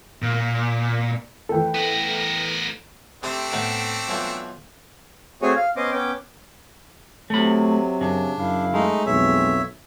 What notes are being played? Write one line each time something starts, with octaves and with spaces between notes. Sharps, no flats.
A#2
E3 A3 A4 G5
B3 A#4
C3 A3 C4 D4 D#6
A2 B3 D#4
B1 E3 F3
A3 C4 F#4 G#4 C#5 G#5
F5
B3 C#4 C5 D#5 D6
B3 C#4 G5 D6
C3 F#3 A3 B5
F#2 C#3 D4
F#2 E4 F5
G#3 A3 D#4
B1 F2 C#5 E5